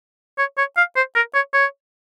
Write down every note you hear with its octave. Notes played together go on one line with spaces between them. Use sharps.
C#5
C#5
F5
C5
A#4
C#5
C#5